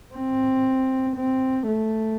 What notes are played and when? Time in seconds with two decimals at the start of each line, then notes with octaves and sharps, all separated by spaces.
0.14 C4
1.16 C4
1.68 A3